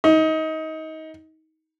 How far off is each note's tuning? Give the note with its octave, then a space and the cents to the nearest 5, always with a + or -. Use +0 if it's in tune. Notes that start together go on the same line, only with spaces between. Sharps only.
D#4 +25